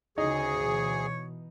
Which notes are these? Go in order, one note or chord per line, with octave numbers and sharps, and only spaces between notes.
D2 C#3 D#4 G#4 C#5
B2 E3